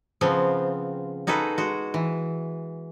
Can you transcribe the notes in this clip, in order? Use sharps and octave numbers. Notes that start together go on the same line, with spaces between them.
C#3 F3 B3 C4
D#4 F#4 G#4 A4 B4
G#3 F#4
E3